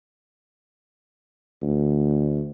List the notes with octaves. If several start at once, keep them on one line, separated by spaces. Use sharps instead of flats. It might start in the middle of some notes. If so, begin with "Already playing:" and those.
D2